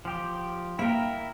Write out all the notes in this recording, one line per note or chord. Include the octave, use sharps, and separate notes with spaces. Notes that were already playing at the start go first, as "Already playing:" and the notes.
F3 G4
A#3 E4 A#4 G5